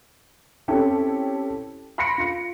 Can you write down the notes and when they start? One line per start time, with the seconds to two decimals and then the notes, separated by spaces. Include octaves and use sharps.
0.68 C4 C#4 E4 G4 A4
1.98 B5 C6 A#6 C#7 D7
2.18 F4 C#7